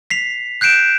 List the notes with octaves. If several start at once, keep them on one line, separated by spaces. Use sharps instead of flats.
B6 C7 F7
F#6 G6 C7 D7 E7